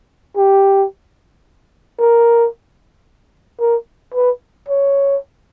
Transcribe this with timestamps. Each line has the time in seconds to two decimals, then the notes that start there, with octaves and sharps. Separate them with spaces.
0.37 G4
1.99 A#4
3.60 A#4
4.14 B4
4.69 C#5